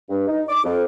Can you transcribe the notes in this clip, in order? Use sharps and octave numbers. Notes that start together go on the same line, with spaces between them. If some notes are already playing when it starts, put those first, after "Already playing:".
G2
D#4
D6
F2